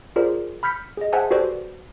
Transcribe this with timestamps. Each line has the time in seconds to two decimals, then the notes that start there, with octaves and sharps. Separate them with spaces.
0.16 F4 G#4 A#4 C5 D5
0.63 B5 F6 G6 B6 C#7
0.97 G#4 D#5
1.13 G#4 C5 E5 F#5 G#5 A5
1.31 F#4 G4 A4 B4 C5 D5